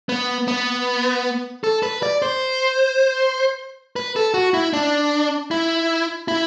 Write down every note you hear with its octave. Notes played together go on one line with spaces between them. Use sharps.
B3
B3
A4
B4
D5
C5
B4
A4
F#4
E4
D4
E4
E4